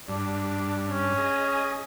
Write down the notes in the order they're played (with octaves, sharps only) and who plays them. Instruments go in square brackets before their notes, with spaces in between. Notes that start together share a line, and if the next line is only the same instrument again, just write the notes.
[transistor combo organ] G2 [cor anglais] D4
[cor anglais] C#4
[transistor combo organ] G#4 D#5